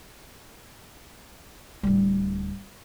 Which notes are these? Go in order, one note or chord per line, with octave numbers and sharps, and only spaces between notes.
D1 G3